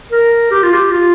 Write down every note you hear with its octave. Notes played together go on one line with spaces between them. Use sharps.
A#4
G4
F4
G4
F4